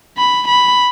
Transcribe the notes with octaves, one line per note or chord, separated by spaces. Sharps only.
B5
B5